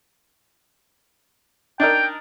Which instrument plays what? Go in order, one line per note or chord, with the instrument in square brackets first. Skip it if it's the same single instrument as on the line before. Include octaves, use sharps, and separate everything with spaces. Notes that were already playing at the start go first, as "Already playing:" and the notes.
[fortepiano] D4 D#4 A#4 [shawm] G5